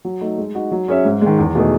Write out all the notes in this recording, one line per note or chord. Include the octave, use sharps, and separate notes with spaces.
F#3
A3 D#4
G#3
D#4 F#4
F#3
C#4 G#4 C#5 E5
G#2
D#3 G#3
E2
B2 A3 D#4 G#4